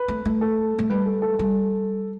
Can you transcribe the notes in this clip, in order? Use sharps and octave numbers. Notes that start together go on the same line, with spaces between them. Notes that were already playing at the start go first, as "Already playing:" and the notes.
Already playing: B4
A3
A3
A4
A3
G3 B4
A4
A4
G3 A4